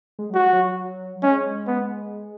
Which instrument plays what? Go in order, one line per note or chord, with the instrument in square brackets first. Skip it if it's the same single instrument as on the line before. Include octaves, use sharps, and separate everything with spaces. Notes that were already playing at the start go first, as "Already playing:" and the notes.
[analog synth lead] G#3
[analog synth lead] F#3 [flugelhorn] F#4
[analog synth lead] F#3
[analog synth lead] G#3 [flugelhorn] C#4
[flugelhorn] B3